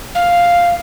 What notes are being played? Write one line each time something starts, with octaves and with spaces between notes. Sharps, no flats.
F5